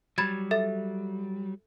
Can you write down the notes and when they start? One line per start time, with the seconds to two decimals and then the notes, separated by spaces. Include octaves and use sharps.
0.18 F#3 G3 B5 G#6 A6
0.51 A4 E5 A6